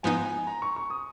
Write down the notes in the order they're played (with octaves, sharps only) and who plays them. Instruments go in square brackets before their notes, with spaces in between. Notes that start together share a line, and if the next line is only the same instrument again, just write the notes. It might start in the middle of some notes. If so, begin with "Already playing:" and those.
[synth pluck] G#2 F3 B3 D#4 [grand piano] G#5
[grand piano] G#5
A#5
C#6
C#6
D#6